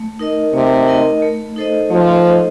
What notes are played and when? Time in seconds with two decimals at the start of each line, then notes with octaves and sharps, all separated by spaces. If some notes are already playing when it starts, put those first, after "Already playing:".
Already playing: A3
0.19 D#4 A#4 D#5
0.53 C3 A3
0.88 D#4 A#4 D#5
1.22 A3
1.56 D#4 A4 C5 D#5
1.90 F3 A3
2.25 D#4 A4 C5 D#5